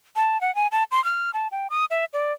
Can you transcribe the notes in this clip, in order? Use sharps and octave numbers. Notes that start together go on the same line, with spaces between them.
A5
F#5
G#5
A5
C6
F6
A5
G5
D#6
E5
D5